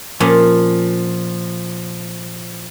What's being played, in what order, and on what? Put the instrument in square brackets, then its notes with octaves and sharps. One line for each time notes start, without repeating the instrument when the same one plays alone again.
[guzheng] A#2 C#4 [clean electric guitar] F3